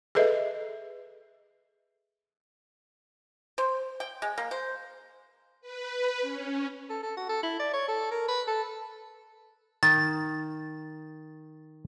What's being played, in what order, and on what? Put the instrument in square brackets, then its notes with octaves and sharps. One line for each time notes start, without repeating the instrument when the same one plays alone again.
[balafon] G#4 A4 B4 D#5 E5
[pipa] C5
G5
G#3
A#3
C5
[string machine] B4
C#4
[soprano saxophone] A4
A4
F#4
A4
E4
D5
C#5
A4
A#4
B4
A4
[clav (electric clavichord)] D#3 [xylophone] A6